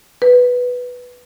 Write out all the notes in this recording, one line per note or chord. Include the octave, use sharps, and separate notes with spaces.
B4